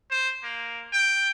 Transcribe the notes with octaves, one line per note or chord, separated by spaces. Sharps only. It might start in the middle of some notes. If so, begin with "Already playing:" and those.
C5
A#3
G5